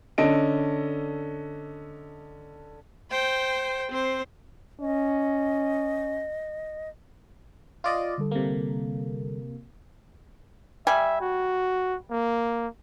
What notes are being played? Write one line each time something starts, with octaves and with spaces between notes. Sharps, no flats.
D3 C#4 A4 D#5 D7
C5 G5
C4 C5
C#4 D#5
F4 D5 D#5
D3 G3 A4
C3 A#3
G3 E5 G#5
F#4
A#3